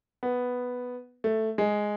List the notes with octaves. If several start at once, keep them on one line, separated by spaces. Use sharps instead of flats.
B3
A3
G#3